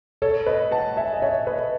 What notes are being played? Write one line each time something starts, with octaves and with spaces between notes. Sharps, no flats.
A4 C#5
B4 D#5
F#5 A5
E5 G#5
D#5
C#5 E5
B4 D#5